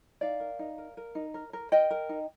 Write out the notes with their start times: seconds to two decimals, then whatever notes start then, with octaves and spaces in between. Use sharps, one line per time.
0.21 D#4 D5 F5
0.40 A#4
0.59 D#4
0.78 A#4
0.97 A#4
1.15 D#4
1.34 A#4
1.53 A#4
1.72 A#4 D#5 G5
1.91 A#4
2.09 D#4